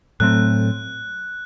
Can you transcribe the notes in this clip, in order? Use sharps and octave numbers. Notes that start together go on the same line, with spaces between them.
A2 F#3 A3 C4 F#6